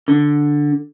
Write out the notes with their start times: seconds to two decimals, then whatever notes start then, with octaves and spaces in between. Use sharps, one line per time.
0.08 D3